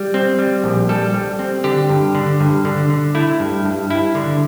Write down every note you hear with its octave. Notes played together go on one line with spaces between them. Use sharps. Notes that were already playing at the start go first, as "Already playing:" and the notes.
Already playing: G3
C4
G3
A#1
G3 A4
G3
C4
D3 G4
G2
D3
G2
D3
D3
A3 E4
G2
G2
G2 E4
D3